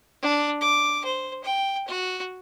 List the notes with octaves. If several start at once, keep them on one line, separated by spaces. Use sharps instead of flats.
D4
D6
C5
G5
F#4